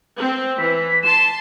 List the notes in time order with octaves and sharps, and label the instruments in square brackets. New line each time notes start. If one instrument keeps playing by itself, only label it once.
[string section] C4
[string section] E3 [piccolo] B6
[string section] A5 C6 [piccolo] E7